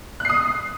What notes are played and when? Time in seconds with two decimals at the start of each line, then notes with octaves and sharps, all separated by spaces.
0.20 F#6
0.25 C7
0.30 D#6